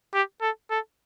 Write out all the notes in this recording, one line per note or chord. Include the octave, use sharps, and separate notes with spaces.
G4
A4
A4